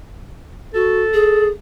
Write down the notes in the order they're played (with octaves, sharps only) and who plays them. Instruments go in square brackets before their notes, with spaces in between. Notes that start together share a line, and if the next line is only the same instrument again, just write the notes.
[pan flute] F#4 [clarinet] A4
[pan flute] G#4